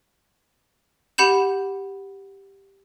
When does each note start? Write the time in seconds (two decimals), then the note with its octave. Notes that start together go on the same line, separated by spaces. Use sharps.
1.18 G4 F#5 B5 G6 E7